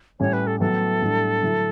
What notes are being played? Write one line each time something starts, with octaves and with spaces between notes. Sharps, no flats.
A2 G3 C#4 C#5
B4
A4
A2 F#3 B3 E4 A4
A2 G3 D4
D3 F#3 A3 E4